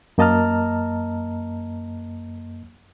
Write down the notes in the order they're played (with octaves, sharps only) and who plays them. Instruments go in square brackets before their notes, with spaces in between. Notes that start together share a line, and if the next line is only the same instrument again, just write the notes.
[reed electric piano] F#2 A#3 D#5 A5 A#5 F6